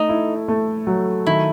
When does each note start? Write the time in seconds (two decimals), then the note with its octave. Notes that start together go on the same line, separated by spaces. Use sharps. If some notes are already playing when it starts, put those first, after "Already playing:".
Already playing: A3 D#4
0.09 E4
0.48 A3
0.87 F#3
1.27 D#3 E4